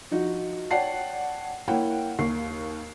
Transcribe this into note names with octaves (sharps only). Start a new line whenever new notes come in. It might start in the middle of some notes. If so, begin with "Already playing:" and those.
F3 D#4 F#4
C#5 D5 F#5 G5 A5 C7
A#3 E4 C#5 F#5 G5
D#2 A#3 C#6 C7